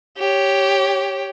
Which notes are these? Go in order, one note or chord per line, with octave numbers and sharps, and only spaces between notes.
G4 C#5